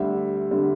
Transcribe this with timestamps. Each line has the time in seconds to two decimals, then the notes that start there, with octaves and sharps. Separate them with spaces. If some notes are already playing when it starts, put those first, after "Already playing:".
Already playing: D2 D3 G3 E5
0.51 D3 G3